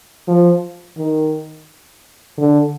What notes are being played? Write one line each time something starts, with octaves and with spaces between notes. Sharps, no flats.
F3
D#3
D3